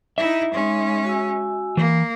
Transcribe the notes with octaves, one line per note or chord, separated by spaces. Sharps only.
D#4 E4 E5
G#3 C#4 D#4 C6
F#4 G#5 E6
E3 A#3